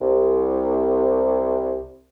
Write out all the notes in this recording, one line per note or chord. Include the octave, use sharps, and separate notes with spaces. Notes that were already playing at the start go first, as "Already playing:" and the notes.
C2 C3